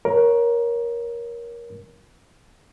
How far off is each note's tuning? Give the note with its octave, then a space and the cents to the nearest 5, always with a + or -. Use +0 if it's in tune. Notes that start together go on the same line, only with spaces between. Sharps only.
A#4 +20 C#5 +0